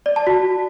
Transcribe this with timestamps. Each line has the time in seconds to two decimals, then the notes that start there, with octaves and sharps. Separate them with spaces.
0.06 D5
0.16 A5
0.27 F#4